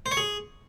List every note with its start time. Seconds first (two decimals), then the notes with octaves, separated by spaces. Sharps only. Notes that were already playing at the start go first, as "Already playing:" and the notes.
0.06 C5
0.11 C#5
0.17 G#4